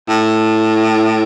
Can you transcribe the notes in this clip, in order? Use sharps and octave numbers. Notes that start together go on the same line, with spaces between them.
A2